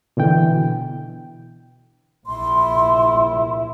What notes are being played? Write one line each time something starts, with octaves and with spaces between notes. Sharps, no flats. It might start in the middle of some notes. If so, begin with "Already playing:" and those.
B2 D3 E3 G5
A#1 E4 C6